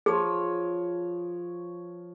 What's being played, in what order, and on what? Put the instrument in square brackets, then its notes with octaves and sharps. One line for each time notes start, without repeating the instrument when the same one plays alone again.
[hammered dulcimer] F3 C#5 [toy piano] G#4